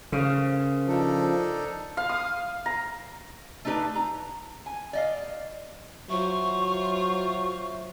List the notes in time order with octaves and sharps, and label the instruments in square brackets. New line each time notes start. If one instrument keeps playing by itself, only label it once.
[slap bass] C#3 [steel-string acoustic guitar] A#4 C5 F5
[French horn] F3 [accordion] D4 D#4 A4
[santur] F5
D#6
A#5
[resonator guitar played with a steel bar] A3 D4 D#4 G4 B4
A#5
G#5
D5 D#5 F5
[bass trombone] F#3 [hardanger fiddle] F4 C5 [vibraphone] E5 [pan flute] C#6